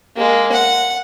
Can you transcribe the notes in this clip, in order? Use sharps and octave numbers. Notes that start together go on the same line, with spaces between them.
G#3 A#3
F#5